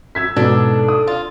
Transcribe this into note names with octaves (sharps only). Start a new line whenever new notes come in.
E6 G#6 B6
G#2 B2 D4 A4
D#6
F4